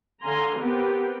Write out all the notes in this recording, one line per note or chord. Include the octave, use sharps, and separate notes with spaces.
D3 F5 G#5 A#5 C6
B3 C4 G4 A#4 B4